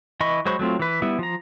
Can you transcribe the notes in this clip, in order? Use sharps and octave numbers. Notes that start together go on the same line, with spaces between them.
E3 D#5 B5 C#6
F#3 G#3 C5 B5 C#6
F#3 A3 C4 F4
E3 B4
G3 B3 E4
F3 A#5